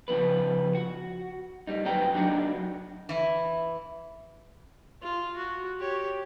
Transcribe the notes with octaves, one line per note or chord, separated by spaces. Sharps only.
C#3 F3 B3 B4
F#4
G3 D#4
F#2 C4 F#4 B4 G5 A#5
F#3 D4 D#4 F#4
E3 E4
F4
F#4
G4 C#5